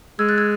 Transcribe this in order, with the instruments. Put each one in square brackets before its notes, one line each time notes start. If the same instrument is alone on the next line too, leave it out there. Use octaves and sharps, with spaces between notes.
[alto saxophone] G#3 [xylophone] E6 G#6
[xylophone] F#6 A6
E6 G#6